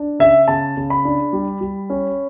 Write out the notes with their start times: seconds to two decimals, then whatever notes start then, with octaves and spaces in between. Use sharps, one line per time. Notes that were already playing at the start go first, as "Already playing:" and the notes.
Already playing: D4
0.19 C#3 E5
0.48 C#3 A5
0.77 C#3
0.90 B5
1.05 D4
1.33 G3
1.61 G3
1.90 C#4